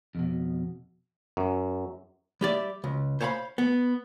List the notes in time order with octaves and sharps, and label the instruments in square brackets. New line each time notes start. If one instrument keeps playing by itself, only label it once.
[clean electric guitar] F2 B2
[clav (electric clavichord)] F#2
[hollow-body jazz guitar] G3 G4 D5 E5
C#2
C5 C#5 F5 A5 B5
B3